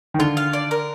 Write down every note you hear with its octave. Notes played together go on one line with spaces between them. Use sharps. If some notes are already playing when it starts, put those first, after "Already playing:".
D#3
D3 F4
F5
D5
A#4